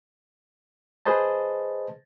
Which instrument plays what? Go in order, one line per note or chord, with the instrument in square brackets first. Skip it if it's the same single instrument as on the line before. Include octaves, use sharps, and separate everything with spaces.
[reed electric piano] G#4 B4 C5 D#5 A5